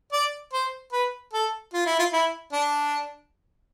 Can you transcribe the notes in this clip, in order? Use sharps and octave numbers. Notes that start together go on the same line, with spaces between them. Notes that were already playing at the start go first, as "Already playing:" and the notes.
D5
C5
B4
A4
F4
E4
F4
E4
D4